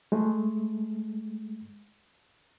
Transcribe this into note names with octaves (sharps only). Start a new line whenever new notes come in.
G#3 A3